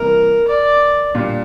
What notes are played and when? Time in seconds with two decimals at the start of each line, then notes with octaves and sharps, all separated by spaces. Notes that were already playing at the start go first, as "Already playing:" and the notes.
Already playing: C3 E3 G3 A#3 A#4
0.48 D5
1.14 A#2 G3 A#3 D4 F4